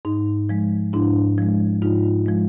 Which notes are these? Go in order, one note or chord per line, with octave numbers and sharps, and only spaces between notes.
G#2 D#4
F3 G#3
G#2 D4 E4
F3 G#3
G#2 D#4 F4
F3 G#3